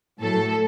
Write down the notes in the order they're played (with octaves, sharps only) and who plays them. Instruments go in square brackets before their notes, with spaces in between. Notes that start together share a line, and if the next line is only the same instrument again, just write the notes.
[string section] A2 F#3 A4